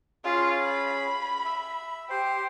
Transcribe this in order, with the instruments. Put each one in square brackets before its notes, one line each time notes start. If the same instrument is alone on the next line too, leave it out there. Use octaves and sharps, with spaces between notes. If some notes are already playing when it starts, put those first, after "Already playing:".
[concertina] C#4 G#4 [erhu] F4
[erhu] B5
[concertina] E5
[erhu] G4 [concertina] C5